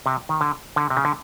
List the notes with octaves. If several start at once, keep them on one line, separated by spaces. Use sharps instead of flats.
C3
D#3
D3
D3
C3
C#3
D3